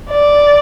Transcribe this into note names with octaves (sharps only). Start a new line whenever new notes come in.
D5